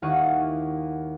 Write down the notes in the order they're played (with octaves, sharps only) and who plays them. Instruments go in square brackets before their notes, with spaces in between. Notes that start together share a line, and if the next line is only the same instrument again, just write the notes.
[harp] D#2 E4 F5 F#5 C#6 D#7